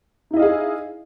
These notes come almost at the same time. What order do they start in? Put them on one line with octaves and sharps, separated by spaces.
D#4 E4 D#5 F5 G#4